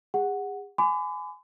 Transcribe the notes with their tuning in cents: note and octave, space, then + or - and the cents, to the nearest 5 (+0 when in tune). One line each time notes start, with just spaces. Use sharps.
G#4 -40 F#5 +0
G#5 +10 B5 +40 D6 +0